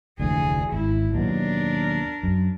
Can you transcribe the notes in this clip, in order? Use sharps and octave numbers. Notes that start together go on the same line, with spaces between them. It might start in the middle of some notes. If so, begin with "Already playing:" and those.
F1 D2 D3 E3 G#4
G#1 E4
D#2 B2 F#3 D4 A#4
F#2